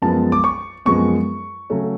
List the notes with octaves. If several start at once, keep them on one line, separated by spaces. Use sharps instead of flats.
F#2 F3 G#3 B3 A5
D6
C#6
F#2 F3 G#3 B3 C#6
C#3 F#3 A3 C#4